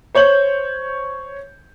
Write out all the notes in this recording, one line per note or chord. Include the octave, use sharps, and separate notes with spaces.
C5 C#5 G6 F#7